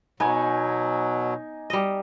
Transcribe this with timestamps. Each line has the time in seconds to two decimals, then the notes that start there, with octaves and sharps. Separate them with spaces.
0.20 B2 F#3 B3 D#4 G#5 D6
1.70 G3 D#5